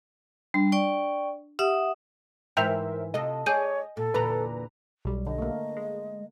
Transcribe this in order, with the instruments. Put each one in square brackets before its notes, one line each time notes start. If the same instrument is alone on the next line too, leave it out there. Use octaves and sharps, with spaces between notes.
[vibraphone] G3 [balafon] D4
[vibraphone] D5 G5 C#6
[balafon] G4 [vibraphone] E5 F#5 D#6
[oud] G#2 E3 [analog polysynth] A#4 C5 E5 [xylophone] G5 G6 F7
[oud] C3 F4 A4 [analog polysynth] D#5
[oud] G#4 D5 [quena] C#5 [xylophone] G#5 G6 D#7
[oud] A#2 [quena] A4
[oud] E2 A#2 D3 [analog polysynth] B4 A#5
[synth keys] B1 G3
[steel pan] D3 [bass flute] D#5
[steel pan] A3 A#3
[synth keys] G#3